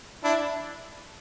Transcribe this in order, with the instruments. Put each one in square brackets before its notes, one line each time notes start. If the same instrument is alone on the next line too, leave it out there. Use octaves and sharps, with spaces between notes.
[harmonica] D4 E4